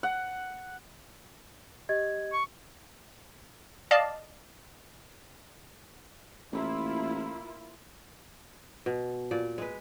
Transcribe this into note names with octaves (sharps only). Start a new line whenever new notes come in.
F#5
G4 D#5 G#6
C#6
D5 D#5 F5 A5
A1 A#3 E4 F4
B2
A#2 D5
G#3 B4